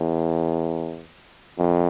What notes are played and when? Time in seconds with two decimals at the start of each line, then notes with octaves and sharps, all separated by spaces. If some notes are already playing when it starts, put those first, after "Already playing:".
Already playing: E2
1.58 F2